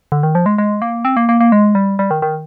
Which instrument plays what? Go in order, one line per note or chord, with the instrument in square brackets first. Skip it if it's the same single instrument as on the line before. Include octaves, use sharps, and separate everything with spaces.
[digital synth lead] D3
D#3
F3
G#3
G#3
A#3
C4
A#3
A#3
A#3
G#3
G3
G3
D#3
D#3